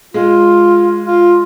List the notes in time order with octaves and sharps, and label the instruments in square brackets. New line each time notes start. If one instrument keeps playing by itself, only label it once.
[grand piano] G#3 [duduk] F4
[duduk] F4